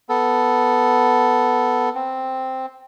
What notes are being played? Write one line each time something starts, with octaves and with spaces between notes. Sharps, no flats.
B3 A4
C4